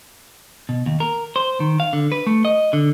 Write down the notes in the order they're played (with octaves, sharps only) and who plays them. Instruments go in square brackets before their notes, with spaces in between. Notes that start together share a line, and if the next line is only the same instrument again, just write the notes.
[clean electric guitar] B2
D#2
A#4
C5
D#3
F5
D3
B4
A3
D#5
D3